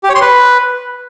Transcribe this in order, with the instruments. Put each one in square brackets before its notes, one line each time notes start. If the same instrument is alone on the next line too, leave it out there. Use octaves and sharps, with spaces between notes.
[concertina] G4
C#5
C6
B4